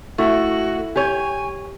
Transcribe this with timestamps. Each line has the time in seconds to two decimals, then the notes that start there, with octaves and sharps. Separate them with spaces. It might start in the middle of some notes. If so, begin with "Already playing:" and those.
0.18 A3 E4 F#4
0.96 G4 C#5 G#5